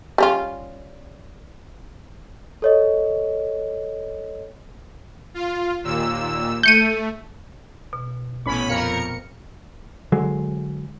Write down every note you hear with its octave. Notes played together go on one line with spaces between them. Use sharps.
G3 C#4 F4
A4 C#5 D#5
F4
D#2 A#2 E6
A3 G6 C#7 D#7
B2
A1 A#2 B3 C#4 B5
F2 A#4 F5 C#7
D3 F#3 G#3